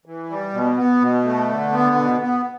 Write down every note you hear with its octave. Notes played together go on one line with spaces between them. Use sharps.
E3
G3
B2
B3
B2
A3
D3
B3
B2
B3